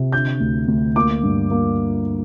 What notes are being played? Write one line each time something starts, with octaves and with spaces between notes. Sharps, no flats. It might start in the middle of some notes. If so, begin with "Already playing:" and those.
Already playing: C3
D3 G6
D2
D2
A#3 D6
G2
A#3